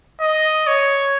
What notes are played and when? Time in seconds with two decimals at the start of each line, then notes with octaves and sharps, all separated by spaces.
0.21 D#5
0.67 C#5